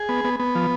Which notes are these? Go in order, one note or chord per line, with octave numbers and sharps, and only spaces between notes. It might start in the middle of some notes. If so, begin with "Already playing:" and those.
Already playing: G#4
B3
B3
B3
F3